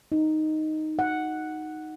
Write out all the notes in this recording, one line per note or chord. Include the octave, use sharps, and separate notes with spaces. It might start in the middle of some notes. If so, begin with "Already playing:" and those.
D#4
F#5